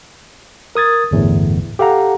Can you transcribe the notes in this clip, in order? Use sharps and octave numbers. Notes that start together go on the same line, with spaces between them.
A#4 D#6 G#6 A6
G1 E2 A2
G4 A4 F5 F#5 A#5